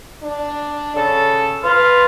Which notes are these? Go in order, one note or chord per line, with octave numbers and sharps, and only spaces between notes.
D4
C#3 A4
F4 B4